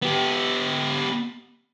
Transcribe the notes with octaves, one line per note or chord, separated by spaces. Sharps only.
B3 G4